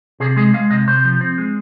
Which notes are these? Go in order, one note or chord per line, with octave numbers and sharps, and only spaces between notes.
C3 G#4
G#3 G#4
G#3 F5
C3 D#5
C3 C5
F3
C4
G#3